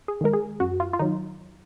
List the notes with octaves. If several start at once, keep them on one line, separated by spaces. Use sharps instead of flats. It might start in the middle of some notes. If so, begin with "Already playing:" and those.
G#4
D#3 G#3 A#4
G#4
F#2 F#4
F4
F4
D#3 F#3 D#4